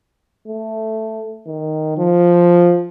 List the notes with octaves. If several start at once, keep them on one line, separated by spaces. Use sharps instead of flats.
A3
D#3
F3